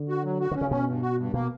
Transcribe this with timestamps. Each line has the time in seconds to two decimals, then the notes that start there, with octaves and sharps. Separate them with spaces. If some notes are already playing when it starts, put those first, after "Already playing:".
Already playing: D3
0.09 F#4
0.24 F#3
0.40 F#4
0.51 D3 C#4
0.61 C#3
0.70 B2 C#4
0.87 G2
1.02 F#4
1.18 G2
1.33 B2 A#3